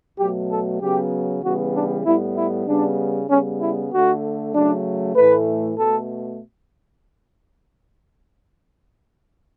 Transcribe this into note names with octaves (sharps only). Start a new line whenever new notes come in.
B2 F#3 A3 G4
A4
C#3 F#3 B3 G4
C#3 E3 G3 B3 F#4
D4
A2 G3 B3 E4
E4
C#3 G3 B3 D4
C#3 G3 B3 C#4
E4
D3 A3 F#4
C#3 F#3 A3 D4
A2 E3 A3 B4
B2 A3 A4